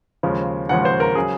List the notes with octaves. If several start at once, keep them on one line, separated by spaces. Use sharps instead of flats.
D#2 C#3 F3 G#3
D#2 C#3 F3 G#3 F#5
C5
A#4
C#3 F#3 G#4